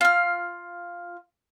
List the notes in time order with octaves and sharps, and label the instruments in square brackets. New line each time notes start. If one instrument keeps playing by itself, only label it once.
[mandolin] F4 F6